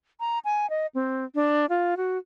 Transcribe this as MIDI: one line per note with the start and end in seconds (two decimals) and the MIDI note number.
0.20 0.39 82
0.45 0.69 80
0.70 0.87 75
0.95 1.25 60
1.35 1.66 62
1.69 1.95 65
1.97 2.18 66